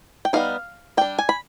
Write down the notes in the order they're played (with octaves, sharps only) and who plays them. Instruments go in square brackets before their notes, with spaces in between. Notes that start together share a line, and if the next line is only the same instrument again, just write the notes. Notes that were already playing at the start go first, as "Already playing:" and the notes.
[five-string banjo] G5
G3 B3 D#4 F5
G3 D4 G5
G#5
B5